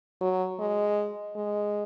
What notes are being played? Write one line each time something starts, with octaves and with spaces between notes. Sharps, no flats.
F#3
G#3
G#3